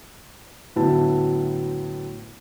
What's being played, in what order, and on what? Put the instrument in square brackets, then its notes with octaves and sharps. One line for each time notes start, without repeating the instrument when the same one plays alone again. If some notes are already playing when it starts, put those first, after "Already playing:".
[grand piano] D2 A2 F#3 B3 E4 A5